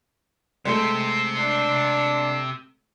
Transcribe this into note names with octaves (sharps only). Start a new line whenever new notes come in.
C3 G#3 A3 C4 A4
D4